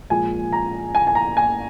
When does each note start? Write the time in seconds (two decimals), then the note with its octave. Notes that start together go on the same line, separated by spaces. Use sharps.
0.10 A#2 F3 G#3 G#5
0.52 A#5
0.95 G#5
1.07 G#5
1.15 A#5
1.37 G#5